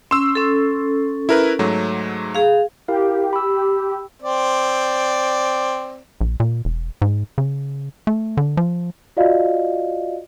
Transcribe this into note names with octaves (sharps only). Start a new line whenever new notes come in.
C#4 C6 E6
C#4 A4
E4 A#4 B4
G#2 F#3 A3
G#4 F5
E4 G4 A#4 F5
B5 E6
C4 D5
A#1
A#2
E1
G#2
C#3
A3
D3
F3
F4 F#4 D5 D#5 F5